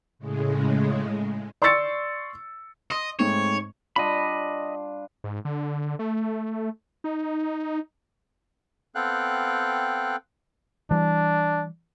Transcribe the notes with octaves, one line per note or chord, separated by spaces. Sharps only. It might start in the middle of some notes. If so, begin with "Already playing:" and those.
A2 C#3 G#3
D5 C6 C#6 E6 A6 C#7
D#5 C6 D#6
G#2 A3 C4 C#5
G3 D4 F4 D#5 B5
G#2
D3
A3
D#4
B3 C4 A4 F5 G5 F#6
E3 G3 D4